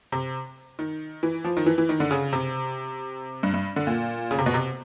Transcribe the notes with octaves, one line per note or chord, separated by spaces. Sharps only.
C3
D#3
E3
F3
D#3
E3
E3
D#3
D3
C#3
C3
G2
G2
D3
A#2
C#3
C3
B2
C3